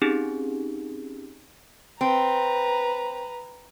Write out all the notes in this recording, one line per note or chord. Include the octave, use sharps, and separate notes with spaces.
C4 C#4 D#4 G4 G#4
C4 B4 A#5